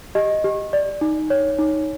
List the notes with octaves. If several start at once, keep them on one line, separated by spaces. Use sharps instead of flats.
G4 D#5
G4
D5
D#4
C#5
D#4